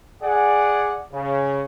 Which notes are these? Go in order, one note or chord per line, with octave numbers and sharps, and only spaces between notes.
G#4 D5 F#5
C#3